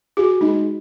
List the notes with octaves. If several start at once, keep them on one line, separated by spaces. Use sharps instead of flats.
F#4 G#4
G#3 D#4